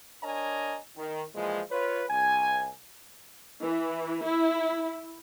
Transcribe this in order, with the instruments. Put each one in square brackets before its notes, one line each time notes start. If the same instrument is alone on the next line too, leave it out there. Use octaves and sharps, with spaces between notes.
[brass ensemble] D4 A#4 C#5 D#5 G#5 A#5
D#3
A#2 E3 F3 G#3
F4 B4 C#5
C2 G#5
[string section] E3
E4